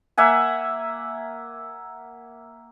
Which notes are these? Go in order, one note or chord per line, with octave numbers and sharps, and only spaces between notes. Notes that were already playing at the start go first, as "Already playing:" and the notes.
A#3 E5 F#5 G#5